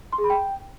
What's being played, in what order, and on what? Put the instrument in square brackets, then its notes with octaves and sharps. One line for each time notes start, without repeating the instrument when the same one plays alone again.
[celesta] C6
G#4
B5
G5